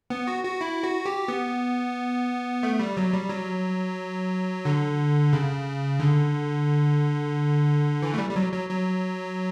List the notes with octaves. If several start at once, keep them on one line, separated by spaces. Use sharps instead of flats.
B3
F#4
F#4
E4
F#4
G4
B3
A3
G3
F#3
G3
F#3
D3
C#3
D3
E3
A3
G3
G3
F#3
F#3
F#3